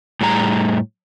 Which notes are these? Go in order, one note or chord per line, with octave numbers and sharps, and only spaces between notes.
A2 G3 G#4 A#5